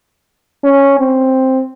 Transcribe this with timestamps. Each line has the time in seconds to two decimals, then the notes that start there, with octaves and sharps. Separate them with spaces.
0.64 C#4
0.99 C4